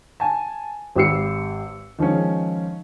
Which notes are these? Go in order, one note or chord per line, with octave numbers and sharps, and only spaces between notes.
G#5 A5
G#1 G4 B4 E6 C7 C#7
D#3 F3 G#3 C#4